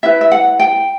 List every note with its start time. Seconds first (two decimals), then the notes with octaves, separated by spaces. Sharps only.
0.03 E4 B4 E5
0.21 E5
0.32 F#5
0.60 G5